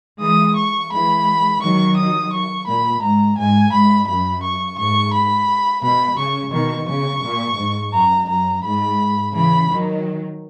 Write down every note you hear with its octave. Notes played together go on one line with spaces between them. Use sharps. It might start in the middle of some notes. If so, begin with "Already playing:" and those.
E3 G#3 D#6
C#6
E3 G#3 B5
D#3 F#3 C#6
D#6
C#6
A#2 B5
G#2 A#5
G#2 G#5
G#2 B5
F#2 B5
C#6
G#2 C#6
B5
B2 B5
C#3 C#6
B2 D#3 C#6
C#3 C#6
A#2
G#2
F#2 A#5
F#2 A#5
G#2 B5
C#3 E3 B5
D#3 F#3